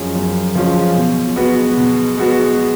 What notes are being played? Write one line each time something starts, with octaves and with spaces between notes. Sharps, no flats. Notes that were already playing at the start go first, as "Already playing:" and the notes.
Already playing: F#2 F3 G#3 C#4 F4
F#2
F3 G#3 C#4 F4
B2
G#3 B3 F#4 B4
B2
G#3 B3 F#4 B4